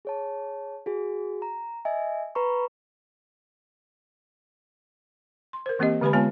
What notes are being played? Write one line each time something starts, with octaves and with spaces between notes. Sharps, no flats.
G#4 C#5 A5
F#4 G#4
A#5
D#5 E5 G#5
B4 A#5 B5 C#6
C6
A#4 C5
E3 A#3 C4 G4 D#5
D3 G#3 G4 B4 G#5 B5
G#3 B3 F4 C#5 G#5 A5